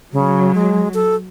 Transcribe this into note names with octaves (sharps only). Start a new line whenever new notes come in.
C#3 F#3
G#3
A4